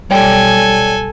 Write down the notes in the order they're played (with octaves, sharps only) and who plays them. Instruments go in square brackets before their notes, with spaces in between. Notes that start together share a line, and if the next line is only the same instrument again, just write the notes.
[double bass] B1 G3 [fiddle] A4 G#5 [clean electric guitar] C#5 D5 G5